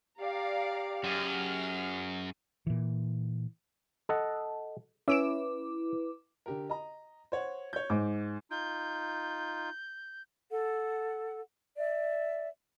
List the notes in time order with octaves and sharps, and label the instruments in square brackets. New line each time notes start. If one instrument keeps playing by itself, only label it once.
[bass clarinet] G4 [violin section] D5 F5 A#5
[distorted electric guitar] F#2 [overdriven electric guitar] F#4 G#4 [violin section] F6
[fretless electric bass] A#2 E3
[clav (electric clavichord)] A4 D#5 F#5
[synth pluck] C#4 D7 E7 [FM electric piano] E4 B4 D6 [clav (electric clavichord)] E5
[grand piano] D3 G4 A#4
D#5 A#5
C5 C#5 F#5
C#5 G6
[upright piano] G#2 [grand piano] D6
[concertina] D#4 F4 [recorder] G6
[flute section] A4 F#5
D5 E5